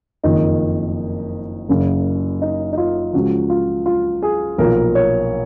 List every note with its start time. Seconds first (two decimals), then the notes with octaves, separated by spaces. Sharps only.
0.24 F#1 F2 D#3 D#4
1.69 F#1 F#2 C#3
2.42 D#4
2.73 D#4
2.78 F4
3.13 C#2 C#3 F3 F#4
3.50 F4
3.86 F4
4.23 G#4
4.58 B1 A#2 F3 A#4
4.95 C#5